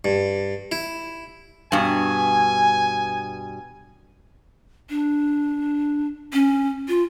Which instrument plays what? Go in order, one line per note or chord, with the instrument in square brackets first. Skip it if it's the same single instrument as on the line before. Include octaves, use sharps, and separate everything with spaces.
[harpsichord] G2
E4
[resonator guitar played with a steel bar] G2 B2 [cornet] G#5
[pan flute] D4
C#4
F4